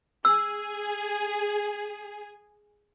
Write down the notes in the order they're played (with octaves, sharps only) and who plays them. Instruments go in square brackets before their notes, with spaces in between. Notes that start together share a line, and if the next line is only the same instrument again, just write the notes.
[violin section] G#4 [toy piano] E6